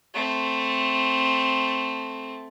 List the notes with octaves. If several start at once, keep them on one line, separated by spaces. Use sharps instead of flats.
A3 C4